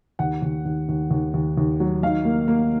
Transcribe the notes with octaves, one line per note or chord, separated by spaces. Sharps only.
D#2 F#5
D#2
D#2
D#2
D#2
D#2
D#2
F#3
D#3 F5
A#3
A#3